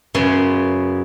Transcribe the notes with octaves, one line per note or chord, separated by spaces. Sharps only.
F#2 C#3 B3 C6